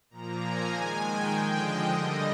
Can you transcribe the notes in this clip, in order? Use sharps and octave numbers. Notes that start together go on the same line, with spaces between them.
A#2 F3 A#3 A#5
G#5
D#3 G#3
G5
D3 F3 G#3
D#5
D3 G3 A#3